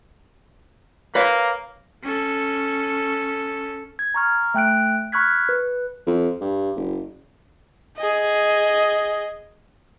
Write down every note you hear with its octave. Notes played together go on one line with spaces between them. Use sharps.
A#3 B4 C#5 F5
C#4 A4
G#6
A#5 C#6 F6
A3 G5 F#6 D7
B5 C#6 F6 F#6 G#6 B6
B4
F2
G2
F#1
G#4 D#5